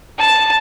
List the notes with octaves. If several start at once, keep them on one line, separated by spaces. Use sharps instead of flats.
A5